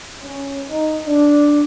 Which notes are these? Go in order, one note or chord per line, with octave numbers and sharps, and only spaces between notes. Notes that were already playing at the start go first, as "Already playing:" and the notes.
C#4
D#4
D4